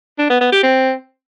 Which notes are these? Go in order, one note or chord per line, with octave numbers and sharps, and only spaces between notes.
D4
B3
B3
G4
C4